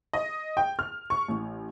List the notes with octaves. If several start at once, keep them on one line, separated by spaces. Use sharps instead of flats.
D#5
G5
F6
C#6
A1